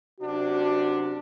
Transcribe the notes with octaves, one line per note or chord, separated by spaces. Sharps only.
F#2 C3 D4 F#4